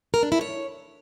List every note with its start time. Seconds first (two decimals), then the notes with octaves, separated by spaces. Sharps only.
0.14 A#4
0.23 D4
0.32 E4
0.41 C#5